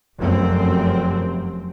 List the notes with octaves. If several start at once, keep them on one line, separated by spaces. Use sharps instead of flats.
F1 F#2 C4